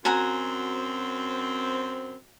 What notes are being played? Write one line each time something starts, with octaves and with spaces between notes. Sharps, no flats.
F#2 C4 F#4 G#5 A#5